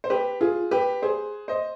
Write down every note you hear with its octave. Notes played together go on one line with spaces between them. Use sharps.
C5
G4 B4
F4 G#4
G4 B4
G#4 C5
C5 D#5